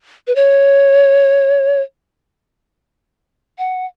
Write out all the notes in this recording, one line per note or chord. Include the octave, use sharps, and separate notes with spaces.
B4
C#5
F#5